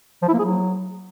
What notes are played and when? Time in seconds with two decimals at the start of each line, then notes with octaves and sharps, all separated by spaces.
0.22 F3
0.28 E4
0.33 A#3
0.39 G#4
0.44 F#3